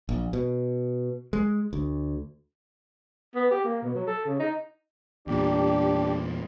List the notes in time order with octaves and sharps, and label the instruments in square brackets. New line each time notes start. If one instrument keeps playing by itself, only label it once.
[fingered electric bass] A#1
B2
G#3
D2
[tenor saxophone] B3
G4
A#3
B2
F#3
A4
C#3
D#4
[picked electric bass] E2 A#2 [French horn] D4 [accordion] G4